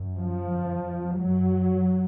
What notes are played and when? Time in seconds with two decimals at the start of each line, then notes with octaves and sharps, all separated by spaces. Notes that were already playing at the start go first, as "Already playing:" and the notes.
Already playing: F#2
0.18 F3
0.52 F2
1.19 F#2 F#3